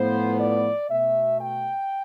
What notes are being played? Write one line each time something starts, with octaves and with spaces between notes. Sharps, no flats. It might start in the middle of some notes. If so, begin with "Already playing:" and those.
Already playing: A2 F3 B3 C5
D5
B2 A3 E5
G5